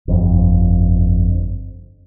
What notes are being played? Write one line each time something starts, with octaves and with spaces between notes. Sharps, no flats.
G1 F2